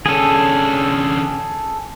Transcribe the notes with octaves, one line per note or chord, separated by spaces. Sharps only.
D3 C#4 G#4 A4